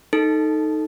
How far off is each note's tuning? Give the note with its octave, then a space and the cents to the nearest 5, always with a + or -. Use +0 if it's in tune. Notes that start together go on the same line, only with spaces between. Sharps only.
D#4 +0 A4 +0